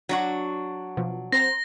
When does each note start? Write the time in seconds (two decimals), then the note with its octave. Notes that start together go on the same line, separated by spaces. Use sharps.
0.09 F#3 D4 F#4
0.97 B2 F3
1.32 C4 C5 A#5 A#6